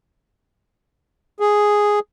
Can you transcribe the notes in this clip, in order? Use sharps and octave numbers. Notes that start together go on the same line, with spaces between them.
G#4